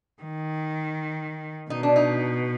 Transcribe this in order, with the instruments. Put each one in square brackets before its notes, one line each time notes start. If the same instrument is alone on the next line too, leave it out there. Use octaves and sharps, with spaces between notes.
[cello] D#3
[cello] B2 [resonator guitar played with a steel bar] D#4
[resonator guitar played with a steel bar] D4
D#4